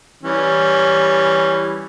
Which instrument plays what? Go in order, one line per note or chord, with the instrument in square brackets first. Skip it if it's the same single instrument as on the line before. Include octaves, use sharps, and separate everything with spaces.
[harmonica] E3 G3 C#4